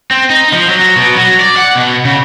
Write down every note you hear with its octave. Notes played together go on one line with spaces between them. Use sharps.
C4
D#4
F3
F#3
B2
F#3
D5
F#5
B2
C#3